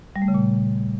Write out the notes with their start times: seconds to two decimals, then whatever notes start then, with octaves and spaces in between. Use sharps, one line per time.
0.16 G3
0.22 A3
0.28 C#3
0.34 A#2